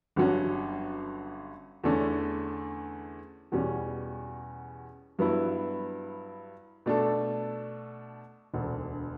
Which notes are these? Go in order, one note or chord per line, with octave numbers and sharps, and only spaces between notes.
G1 G2 F#3 C#4 F#4
E2 D3 A3 C#4
E2 B2 G3 C#4
G2 F#3 B3 E4
B2 A3 D4 A4
E1 D2 D3